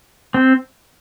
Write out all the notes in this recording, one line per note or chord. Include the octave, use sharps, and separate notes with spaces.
C4